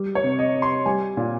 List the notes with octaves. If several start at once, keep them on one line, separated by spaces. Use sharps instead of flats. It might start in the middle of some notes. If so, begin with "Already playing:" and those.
Already playing: G3
C#5
C3
D#5
C3
C6
G3 G#5
A#2